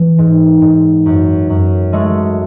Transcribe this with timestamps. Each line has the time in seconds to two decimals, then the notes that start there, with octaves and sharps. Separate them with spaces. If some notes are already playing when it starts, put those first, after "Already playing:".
Already playing: E3
0.18 G#2
0.62 G#2
1.06 F#2
1.50 F#2
1.93 G#3 A3